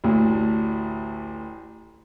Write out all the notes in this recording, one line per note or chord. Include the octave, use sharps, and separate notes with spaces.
A1 D2